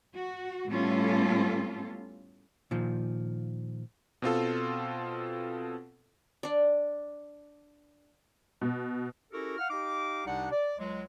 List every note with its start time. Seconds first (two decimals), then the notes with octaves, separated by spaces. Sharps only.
0.14 F#4
0.68 A2 G3 B3 C#4 F4 A4
2.71 A#2 D#3 F3
4.22 B2 C4 F4 A4
6.43 D4 D5
8.61 B2
9.33 C#4 E4 F#4 G4 A4 A#4
9.58 F5 F#5 F6
9.70 D#4 G4 F5 D6
10.26 C2 C3 D4 D#4 D5 F#5
10.52 D5
10.79 C#2 F#3 G#3